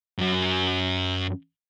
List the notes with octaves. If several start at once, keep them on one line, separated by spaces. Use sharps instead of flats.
F#2 F#3